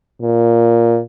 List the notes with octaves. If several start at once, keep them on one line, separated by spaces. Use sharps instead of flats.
A#2